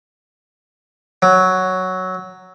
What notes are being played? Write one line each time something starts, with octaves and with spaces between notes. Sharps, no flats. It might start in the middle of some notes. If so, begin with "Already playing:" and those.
F#3